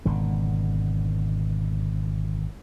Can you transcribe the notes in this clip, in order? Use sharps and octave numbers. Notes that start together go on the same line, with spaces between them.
G#1 B2 D3